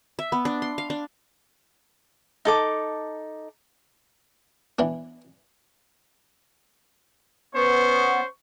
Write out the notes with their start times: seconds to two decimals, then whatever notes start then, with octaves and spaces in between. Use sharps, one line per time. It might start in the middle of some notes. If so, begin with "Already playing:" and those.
0.19 E5
0.32 B3
0.45 D4
0.62 C6
0.78 F5
0.90 D4
2.45 D#4 A4 D6
4.79 E3 B3 D4
7.55 B3 C#4 C5 C#6